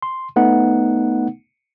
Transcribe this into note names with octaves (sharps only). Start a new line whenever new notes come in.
C6
A3 B3 D#4 F#5